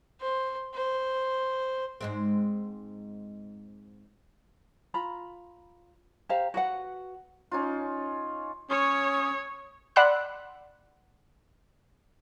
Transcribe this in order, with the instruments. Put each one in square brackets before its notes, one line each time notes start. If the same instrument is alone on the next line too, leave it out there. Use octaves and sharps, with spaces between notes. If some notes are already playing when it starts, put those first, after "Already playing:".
[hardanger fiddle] C5
C5
[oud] G#2 G#3 C4
[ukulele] F4 A#5 B5
G4 C5 F5 A#5
F#4 B4 F#5
[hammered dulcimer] C#4 D#4 F4
[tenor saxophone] C#4 [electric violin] C#5 [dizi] D#6
[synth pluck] D5 F#5 B5 C6 E6 F#6